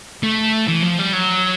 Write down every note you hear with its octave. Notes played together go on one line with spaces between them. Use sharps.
A3
E3
F3
G3
F#3